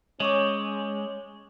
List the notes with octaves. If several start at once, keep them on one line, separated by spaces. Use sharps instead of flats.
G#3 C#4 C#5 C#6 D6